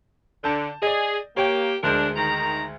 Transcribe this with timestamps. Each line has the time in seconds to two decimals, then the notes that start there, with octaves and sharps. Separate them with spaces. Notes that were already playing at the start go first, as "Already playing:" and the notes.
0.44 D3 A5 G6
0.83 G#4 D5 D#5
1.37 A#3 G4 C#5 G5
1.83 D2 G#3 D4 A#4 G6
2.16 D#3 A#5